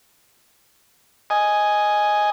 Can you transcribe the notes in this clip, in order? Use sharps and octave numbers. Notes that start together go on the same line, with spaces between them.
D#5 G#5